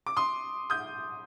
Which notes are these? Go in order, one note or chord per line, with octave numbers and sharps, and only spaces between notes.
D6
C6 D#6
D#6 G6